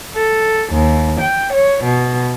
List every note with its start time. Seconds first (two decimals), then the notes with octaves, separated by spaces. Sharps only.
0.14 A4
0.71 D#2
1.19 G5
1.52 C#5
1.83 B2